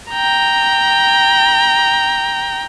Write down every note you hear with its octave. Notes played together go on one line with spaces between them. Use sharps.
G5 A#5